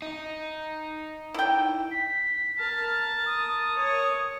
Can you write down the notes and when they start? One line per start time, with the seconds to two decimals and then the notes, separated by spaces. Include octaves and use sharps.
0.02 D#4
1.34 E4 G5
1.91 B6
2.58 A#4 A5 F6
3.26 D#6
3.76 C#5